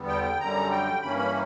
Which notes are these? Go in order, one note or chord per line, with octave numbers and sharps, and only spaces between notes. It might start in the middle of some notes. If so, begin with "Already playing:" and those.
Already playing: E2 D3 G3 B3
G5
G5
F#2 D3 G3 A#5
G5
G2 E3 A#3 C#4 B5
B5